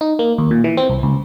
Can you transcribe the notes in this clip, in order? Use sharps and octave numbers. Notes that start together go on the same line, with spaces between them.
D#4
A#3
D#2
A#2
E3
C4
C2
C#2